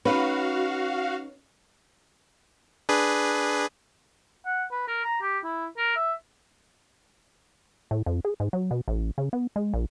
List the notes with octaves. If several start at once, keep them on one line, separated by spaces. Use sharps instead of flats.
C#4 D#4 F#4 B4 F5
D4 G#4 B4
F#5
B4
A#4
A#5
G4
E4
A#4
E5
A2
F2
G#4
G#2
F#3
B2
A1
C#3
B3
G#3
A#1